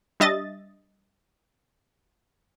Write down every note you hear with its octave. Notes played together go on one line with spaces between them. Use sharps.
G3 D4 D#5 E5 A6